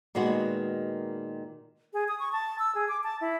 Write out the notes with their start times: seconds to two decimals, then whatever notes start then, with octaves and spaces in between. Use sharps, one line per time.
0.15 A#2 D#3 G#3 B3 F#4
1.93 G#4
2.08 D#6
2.19 C#6
2.32 A5
2.59 E6
2.75 G#4
2.88 D6
3.04 A5
3.21 E4